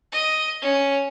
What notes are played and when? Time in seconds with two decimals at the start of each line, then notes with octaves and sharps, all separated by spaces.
0.12 D#5
0.62 C#4